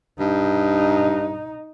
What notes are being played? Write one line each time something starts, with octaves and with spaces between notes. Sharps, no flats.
G2 D#4